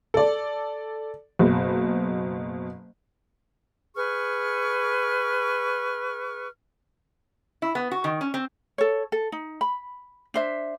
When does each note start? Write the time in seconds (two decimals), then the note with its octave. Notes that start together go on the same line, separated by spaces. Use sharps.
0.14 A4 D5
1.39 F#1 B2
3.95 G#4 B4 C#6 F6
7.62 E4
7.75 B3
7.91 F#4
8.04 D#3
8.21 C#4
8.34 C4
8.78 A4 C#5
9.12 A4
9.32 D#4
9.61 B5
10.34 D4 C5 E5